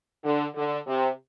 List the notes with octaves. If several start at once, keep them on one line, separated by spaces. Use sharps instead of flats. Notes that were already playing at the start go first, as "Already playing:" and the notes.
D3
D3
C3